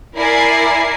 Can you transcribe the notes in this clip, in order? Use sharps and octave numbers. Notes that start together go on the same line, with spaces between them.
E4 A#4 D5 G#5 C7